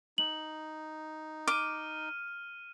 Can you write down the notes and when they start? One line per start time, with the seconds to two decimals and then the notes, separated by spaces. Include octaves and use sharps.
0.18 D#4 F#7
1.48 D6 F6 D#7